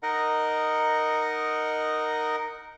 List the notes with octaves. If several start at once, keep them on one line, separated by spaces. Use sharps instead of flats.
D#4 A#4 D#5 F#5